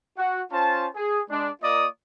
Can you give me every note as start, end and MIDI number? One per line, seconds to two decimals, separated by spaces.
0.17 0.42 66
0.17 0.42 78
0.52 0.87 61
0.52 0.87 65
0.52 0.87 72
0.52 0.87 81
0.95 1.21 68
1.30 1.50 56
1.30 1.50 62
1.62 1.86 58
1.62 1.86 65
1.62 1.86 70
1.62 1.86 74
1.62 1.86 75
1.62 1.86 87